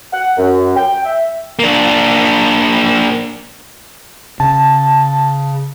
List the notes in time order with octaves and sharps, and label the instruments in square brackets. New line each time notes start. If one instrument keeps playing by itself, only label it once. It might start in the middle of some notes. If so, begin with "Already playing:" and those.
[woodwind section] F#5
F#2
G5
E5
[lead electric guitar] A#3 D4
[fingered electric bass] C#3 [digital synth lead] A5